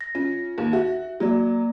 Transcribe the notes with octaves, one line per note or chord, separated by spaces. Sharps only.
A#6
C#4 F4
D#2
F#4 E5
F#3 A#3 D5